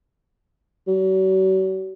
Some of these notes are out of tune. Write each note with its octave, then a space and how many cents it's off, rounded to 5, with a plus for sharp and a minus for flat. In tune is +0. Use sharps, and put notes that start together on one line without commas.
F#3 +40